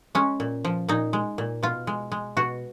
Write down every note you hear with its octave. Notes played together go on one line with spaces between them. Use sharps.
G#3 C#4
A#2
F3
A#2 D#4
G#3
A#2
B2 F4
G#3
G#3
B2 F#4